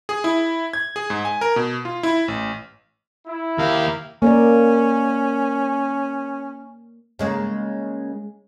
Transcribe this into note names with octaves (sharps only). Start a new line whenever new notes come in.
G#4
E4
G#6
G#4
G#2
G#5
A#4
B2
F4
E4
A1
E4
D#2 G4 A#4 F5
A#3 C#4 A#4 D5
C#3 G#3 A#3